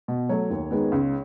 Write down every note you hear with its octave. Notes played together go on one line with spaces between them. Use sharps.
B2
F#3 A3 C#5
D#2
D#3 G#3 B3
C#2